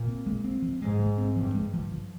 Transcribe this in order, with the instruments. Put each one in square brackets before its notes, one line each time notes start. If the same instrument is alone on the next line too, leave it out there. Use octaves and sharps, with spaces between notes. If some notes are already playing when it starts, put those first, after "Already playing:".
Already playing: [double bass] A#2
[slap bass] C4
G#3
C4
F3
[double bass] G#2 [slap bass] G#3
[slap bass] G#3
C4
[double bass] G2 [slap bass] F3
[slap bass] G#3
F3
F3